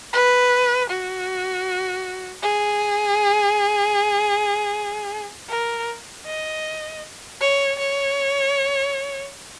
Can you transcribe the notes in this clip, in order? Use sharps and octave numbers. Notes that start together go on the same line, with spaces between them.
B4
F#4
G#4
A#4
D#5
C#5
C#5